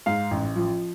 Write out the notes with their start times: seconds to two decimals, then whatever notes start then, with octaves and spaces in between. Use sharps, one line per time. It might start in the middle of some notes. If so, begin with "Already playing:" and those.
0.06 G#2 F5
0.31 A1
0.56 F3